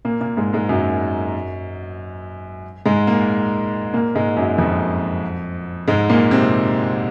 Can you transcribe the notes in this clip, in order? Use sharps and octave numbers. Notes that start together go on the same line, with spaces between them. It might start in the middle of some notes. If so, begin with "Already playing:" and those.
A#2 A#3
A#2 A#3
G#2 G#3
G#2 G#3
F#2 F#3
G#2 G#3
A#2 A#3
A#2 A#3
G#2 G#3
F#2 F#3
F2 F3
G#2 G#3
A#2 A#3
C3 C4